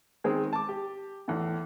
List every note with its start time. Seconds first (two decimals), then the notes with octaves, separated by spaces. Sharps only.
0.24 D#3 G#3 C4 G#4
0.53 A5 D6
0.69 G4
1.28 E2 A2